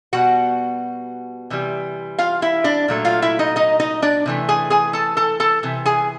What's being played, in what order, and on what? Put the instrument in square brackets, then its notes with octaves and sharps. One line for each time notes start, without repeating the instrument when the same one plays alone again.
[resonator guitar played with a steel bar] B2 G3 F#4 F#5
C3 E3 G3
F4 F5
E4 E5
D4 D5
A#2 F#3 A3
F4 F5
E4 E5
D#4 D#5
D#4 D#5
D#4 D#5
D4 D5
C3 E3 A3
G#4 G#5
G#4 G#5
A4 A5
A4 A5
A4 A5
C3 E3
G#4 G#5